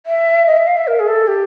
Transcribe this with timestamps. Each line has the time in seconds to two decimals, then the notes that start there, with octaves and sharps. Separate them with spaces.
0.06 E5
0.47 D#5
0.57 E5
0.67 F5
0.77 E5
0.87 A#4
1.00 G#4
1.08 A4
1.28 G4